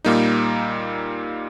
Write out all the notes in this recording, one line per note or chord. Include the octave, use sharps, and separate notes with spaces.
A#2 G3 A#3 D#4